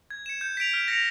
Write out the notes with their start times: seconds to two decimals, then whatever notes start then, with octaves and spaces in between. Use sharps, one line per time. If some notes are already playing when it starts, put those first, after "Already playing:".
0.11 G#6
0.26 C#7 E7
0.41 G6
0.57 B6 D7 F7
0.74 F6
0.88 A#6 C#7 F7